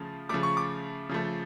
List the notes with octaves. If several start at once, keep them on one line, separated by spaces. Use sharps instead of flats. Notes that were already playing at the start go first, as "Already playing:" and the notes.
Already playing: C#3 F3 A3
C#3 F3 A3 D6
C#6
D6
C#3 F3 A3